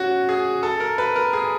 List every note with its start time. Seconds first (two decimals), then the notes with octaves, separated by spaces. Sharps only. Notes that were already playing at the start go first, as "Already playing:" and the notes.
Already playing: C#4 F#4
0.29 G#4
0.63 A4
0.80 A#4
0.98 B4
1.16 A#4
1.33 G#4